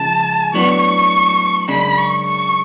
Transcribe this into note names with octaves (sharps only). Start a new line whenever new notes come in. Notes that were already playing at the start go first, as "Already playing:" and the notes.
Already playing: C#3 F3 G#3 A5
A2 F#3 B3 D4 C#6
F#2 C#3 G#3 D4 B5
C#6
C#6